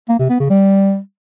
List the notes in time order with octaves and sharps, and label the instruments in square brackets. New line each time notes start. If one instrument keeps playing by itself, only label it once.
[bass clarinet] A#3
C3
B3
C#3
G3